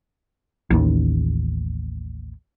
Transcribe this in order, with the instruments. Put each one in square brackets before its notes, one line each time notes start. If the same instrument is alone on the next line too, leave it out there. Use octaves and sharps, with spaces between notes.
[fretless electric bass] A1 D#2